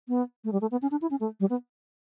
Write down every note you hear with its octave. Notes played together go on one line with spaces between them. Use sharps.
B3
A3
G3
A3
B3
C#4
D4
E4
C#4
A3
G3
B3